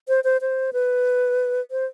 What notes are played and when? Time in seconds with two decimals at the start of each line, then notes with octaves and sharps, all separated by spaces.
0.08 C5
0.24 C5
0.41 C5
0.73 B4
1.71 C5